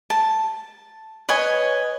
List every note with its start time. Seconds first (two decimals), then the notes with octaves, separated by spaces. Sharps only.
0.10 A5
1.29 B4 C#5 D#5 G#5